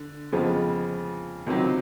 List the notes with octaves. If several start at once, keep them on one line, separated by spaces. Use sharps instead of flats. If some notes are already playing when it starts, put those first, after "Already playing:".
Already playing: D3
F2 C#3 F3 G#3 B3
C#2 C3 D#3 F#3